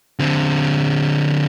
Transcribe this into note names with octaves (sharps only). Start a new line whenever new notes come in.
D3 C4